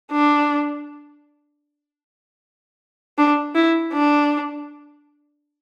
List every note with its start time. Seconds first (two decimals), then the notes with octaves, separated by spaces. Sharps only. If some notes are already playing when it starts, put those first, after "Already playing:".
0.12 D4
3.18 D4
3.55 E4
3.93 D4